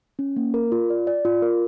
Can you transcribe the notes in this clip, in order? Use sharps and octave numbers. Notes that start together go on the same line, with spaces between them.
C#4
A#3
A#4
F4
D5
D5
F4
A#4